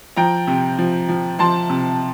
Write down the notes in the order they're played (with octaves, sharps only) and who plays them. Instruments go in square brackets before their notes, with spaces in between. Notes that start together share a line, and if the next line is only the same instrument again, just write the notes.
[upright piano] F3 G5 A#5
C3
F3
F3
F3 A5 C6
C3